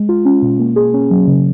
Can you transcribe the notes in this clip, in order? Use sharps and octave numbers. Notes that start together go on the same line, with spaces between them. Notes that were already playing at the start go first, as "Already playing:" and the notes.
Already playing: G#3
F4
C#4
B2
A#3
G#4
C#4
F#3
C#3